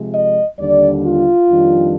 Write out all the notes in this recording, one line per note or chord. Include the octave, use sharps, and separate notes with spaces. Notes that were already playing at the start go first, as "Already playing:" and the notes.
Already playing: C3 F3 G#3
D#5
D#2 D3 G3 D4 D5
F4
F2 D#3 G3 D4